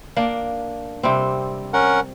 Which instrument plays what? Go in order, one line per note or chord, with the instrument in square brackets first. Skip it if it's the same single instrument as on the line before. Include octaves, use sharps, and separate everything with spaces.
[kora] A#3 D4
C3 G3 C4
[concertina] C#4 A#4 F#5